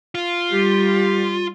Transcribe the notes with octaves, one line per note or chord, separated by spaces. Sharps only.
F4
G3 G4